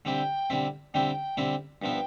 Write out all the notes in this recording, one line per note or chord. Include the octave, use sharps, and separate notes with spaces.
D3 G3 C4 E4 G5
D3 G3 C4 E4
D3 G3 C4 E4 G5
D3 G3 C4 E4
G2 F3 B3 E4 G5